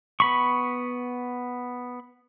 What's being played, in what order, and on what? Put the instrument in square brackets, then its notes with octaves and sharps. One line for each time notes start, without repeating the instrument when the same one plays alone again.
[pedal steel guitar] B3 B5 C#6